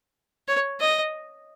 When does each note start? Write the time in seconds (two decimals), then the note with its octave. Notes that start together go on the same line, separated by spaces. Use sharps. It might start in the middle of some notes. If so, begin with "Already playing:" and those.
0.48 C#5
0.80 D#5